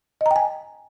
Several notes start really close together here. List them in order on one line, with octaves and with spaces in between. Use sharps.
D#5 A#5 G5 G#5